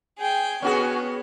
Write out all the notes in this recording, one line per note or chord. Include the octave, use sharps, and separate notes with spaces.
G#4 G5
B3 C#4 F#4 G#4